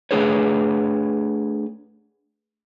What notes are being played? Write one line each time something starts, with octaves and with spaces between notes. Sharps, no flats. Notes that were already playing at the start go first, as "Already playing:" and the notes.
A3 D4 G#4 B4 C#5